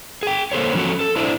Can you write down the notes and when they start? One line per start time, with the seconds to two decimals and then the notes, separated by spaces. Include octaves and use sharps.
0.23 G#4 G5
0.52 A#3 A4 C5 C#5
0.74 D3 F3 F#3 C#4 F#4 A4
1.00 A4
1.16 D4 E4 C5 D5